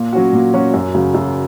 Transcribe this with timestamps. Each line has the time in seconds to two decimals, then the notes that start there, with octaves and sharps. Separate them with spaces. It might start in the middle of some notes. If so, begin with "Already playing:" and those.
Already playing: A#2
0.13 F#3 C#4 F#4
0.33 A#2
0.54 F#3 C#4 F#4
0.74 F#2
0.94 C#3 F#3
1.14 F#2